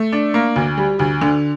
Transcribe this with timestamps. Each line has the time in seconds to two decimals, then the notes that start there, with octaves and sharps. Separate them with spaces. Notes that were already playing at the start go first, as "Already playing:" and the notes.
Already playing: A3
0.12 D4
0.34 A#3
0.56 D2
0.77 G3
0.99 D2
1.21 D3